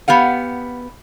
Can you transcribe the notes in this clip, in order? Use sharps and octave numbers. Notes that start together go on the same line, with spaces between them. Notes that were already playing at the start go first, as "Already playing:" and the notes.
B3 G4 F5 F#5